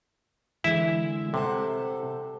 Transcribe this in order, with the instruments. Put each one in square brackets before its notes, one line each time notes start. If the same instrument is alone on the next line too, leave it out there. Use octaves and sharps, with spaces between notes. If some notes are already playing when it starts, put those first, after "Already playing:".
[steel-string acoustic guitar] D3 E3 G#3 [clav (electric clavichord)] E4 E5
[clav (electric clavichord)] C3 [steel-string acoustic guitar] G3 C5 F#5 [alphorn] A4